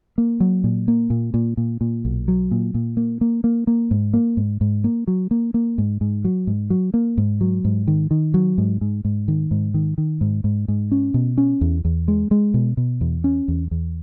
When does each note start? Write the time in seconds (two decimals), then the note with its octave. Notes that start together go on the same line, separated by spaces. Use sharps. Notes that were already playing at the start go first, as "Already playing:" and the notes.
0.18 A#3
0.40 F#3
0.64 A#2
0.88 A#3
1.10 A#2
1.34 A#2
1.57 A#2
1.81 A#2
2.05 B1
2.28 F#3
2.51 A#2
2.74 A#2
2.97 A#3
3.21 A#3
3.44 A#3
3.67 A#3
3.91 G#2
4.14 A#3
4.37 G#2
4.61 G#2
4.84 A#3
5.07 F#3
5.31 A#3
5.54 A#3
5.78 G#2
6.01 G#2
6.25 F#3
6.47 G#2
6.70 F#3
6.94 A#3
7.18 G#2
7.41 F#3
7.65 G#2
7.87 D#3
8.11 D#3
8.34 F#3
8.58 G#2
8.81 G#2
9.05 G#2
9.28 D#3
9.51 G#2
9.74 D#3
9.98 D#3
10.21 G#2
10.44 G#2
10.68 G#2
10.92 C#4
11.14 B2
11.38 C#4
11.61 E2
11.85 E2
12.08 G#3
12.31 G#3
12.54 B2
12.77 B2
13.01 E2
13.24 C#4
13.48 E2
13.71 E2